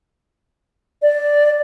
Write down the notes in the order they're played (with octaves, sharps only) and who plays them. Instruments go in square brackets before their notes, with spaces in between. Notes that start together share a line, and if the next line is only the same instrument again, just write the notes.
[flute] D5